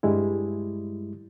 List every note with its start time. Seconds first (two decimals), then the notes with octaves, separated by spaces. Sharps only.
0.03 G2 G3 G#3 E4